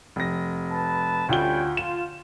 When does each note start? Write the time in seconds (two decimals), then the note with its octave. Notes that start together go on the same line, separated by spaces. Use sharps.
0.16 F1 A#6
0.72 B4 A5
1.29 D2 G3 C#4 F4 G5 G7
1.77 F4 E7